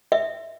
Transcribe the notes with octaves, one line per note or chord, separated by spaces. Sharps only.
E5